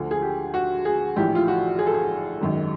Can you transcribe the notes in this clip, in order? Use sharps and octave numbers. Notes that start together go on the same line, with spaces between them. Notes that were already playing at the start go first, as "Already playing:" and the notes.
Already playing: D2 D3 F3
G#4
G4
F#4
G#4
A#1 A2 E3 G4
F4
F#4
G#4
A4
G#4
G#1 F#2 D#3